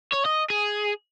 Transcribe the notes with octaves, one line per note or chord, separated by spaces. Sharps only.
C#5
D#5
G#4